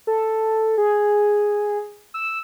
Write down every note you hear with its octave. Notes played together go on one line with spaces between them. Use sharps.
A4
G#4
E6